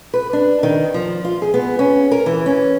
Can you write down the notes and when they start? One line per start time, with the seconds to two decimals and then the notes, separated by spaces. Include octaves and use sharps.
0.14 B4
0.33 D4
0.63 D#3
0.94 F3
1.25 F4
1.42 G#4
1.54 B3
1.79 C#4
2.11 A#4
2.26 E3
2.46 C#4